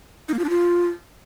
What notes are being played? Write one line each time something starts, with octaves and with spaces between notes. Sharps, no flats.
D#4
A#3
F4
D4
F4